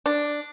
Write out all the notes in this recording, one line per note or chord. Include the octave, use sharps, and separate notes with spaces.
D4